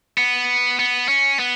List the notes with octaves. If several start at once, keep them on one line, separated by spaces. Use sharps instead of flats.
B3
B3
C#4
B3